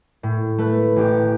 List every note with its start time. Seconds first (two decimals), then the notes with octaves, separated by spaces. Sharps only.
0.23 A2
0.58 A3 B4
0.96 A1 G4